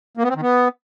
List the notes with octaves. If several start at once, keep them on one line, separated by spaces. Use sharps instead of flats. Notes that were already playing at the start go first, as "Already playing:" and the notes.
A#3
B3
C4
D#3
B3